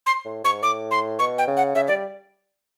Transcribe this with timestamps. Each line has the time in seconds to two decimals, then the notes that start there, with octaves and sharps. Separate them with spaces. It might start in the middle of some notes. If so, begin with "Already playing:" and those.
0.06 C6
0.25 A2
0.44 G#2 C#6
0.63 A2 D6
0.91 C6
1.19 B2 C#6
1.38 G5
1.48 C#3
1.57 F#5
1.75 C#3 E5
1.88 G3 D5